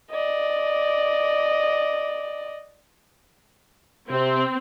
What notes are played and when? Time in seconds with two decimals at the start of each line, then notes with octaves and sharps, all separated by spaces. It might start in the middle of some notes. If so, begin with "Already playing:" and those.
0.11 D5 D#5
4.10 C3 C4